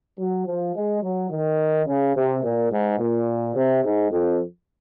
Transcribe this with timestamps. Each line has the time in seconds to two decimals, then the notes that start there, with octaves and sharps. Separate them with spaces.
0.19 F#3
0.47 F3
0.76 G#3
1.03 F#3
1.31 D#3
1.87 C#3
2.16 C3
2.44 A#2
2.72 G#2
2.99 A#2
3.56 C3
3.84 G#2
4.11 F2